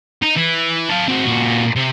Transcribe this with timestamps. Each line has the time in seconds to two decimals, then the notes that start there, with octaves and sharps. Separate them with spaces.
0.22 D#4
0.37 E3
0.89 A4 F5
1.08 C4 F#4
1.24 A#2 F#4
1.76 C3